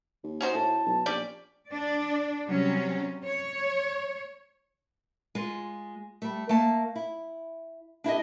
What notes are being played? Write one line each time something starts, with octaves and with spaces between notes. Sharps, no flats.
D#2
C#4 D#4 F#4 C5
A2 A5
B1
A#1 C#4 G4 D5
D4 D5
C3 F#3 G3 C#4
C#5
G#3 F4
G3 A3
A3 A#3 A5
E4
D4 E4 G4 D#5